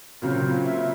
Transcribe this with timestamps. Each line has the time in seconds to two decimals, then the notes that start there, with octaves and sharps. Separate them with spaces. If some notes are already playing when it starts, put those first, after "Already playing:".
0.22 A#2 C#3 F#3 C4
0.65 E5